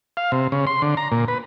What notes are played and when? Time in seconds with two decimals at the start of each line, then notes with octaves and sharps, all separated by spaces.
0.17 F5
0.32 C3
0.52 C#3
0.67 C6
0.82 D3
0.97 A#5
1.12 A#2
1.28 B4